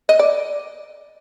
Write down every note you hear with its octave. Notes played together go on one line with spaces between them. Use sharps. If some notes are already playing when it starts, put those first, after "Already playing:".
D#5
D5